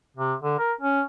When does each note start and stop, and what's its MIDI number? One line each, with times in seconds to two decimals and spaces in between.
0.17 0.34 48
0.43 0.57 50
0.59 0.73 70
0.81 1.02 61